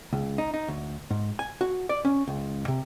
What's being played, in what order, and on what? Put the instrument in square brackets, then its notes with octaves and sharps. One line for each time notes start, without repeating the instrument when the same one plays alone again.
[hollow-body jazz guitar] C#2
D#4
D#4
D2
G#2
G#5
F#4
D5
C#4
C#2
C3